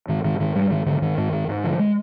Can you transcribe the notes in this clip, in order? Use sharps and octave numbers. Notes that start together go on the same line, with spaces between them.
G#2 D#3
G#2 D#3
G#2 D#3
G#2 G3
G#2 D#3
G#2 D3
G#2 D#3
G#2
G#2
G#2
D3 F3
G#3